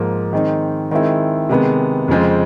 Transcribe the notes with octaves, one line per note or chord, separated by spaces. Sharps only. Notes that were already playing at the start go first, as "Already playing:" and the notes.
Already playing: G#2 F3 A#3
D#3 G#3 C4 D#4
D#3 G#3 C4 E4
C3 D#3 G#3 B3
F2 C#3 F3 G#3 C4